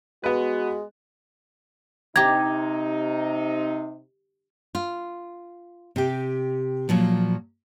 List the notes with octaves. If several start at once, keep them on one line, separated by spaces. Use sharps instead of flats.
G#3 B3 F#4 B4
C3 D#4 G4 A#5 G#6
F4
C3 G4
A#2 F3 F#3